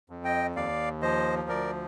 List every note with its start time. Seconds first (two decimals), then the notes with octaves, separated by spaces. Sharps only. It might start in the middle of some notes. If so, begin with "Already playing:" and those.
0.10 F2
0.24 D#5 G5
0.55 D#2 D5 F5
1.02 F3 C5 D#5
1.49 D2 A#4 D5